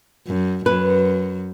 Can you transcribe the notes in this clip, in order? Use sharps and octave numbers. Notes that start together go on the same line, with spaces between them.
F#2
F#2 B4